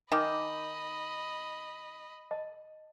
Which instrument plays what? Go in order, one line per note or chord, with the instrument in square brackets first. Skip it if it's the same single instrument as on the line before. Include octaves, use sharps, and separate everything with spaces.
[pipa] D#3 [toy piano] D#4 G#5 D6 [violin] D#5 B5
[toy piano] D#5 A5